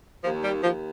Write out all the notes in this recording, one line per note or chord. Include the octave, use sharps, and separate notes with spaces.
D#2 F3
G3
D#2 F3